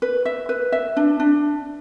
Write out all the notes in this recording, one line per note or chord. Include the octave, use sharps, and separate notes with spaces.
B4
E5
B4
E5
D4
D4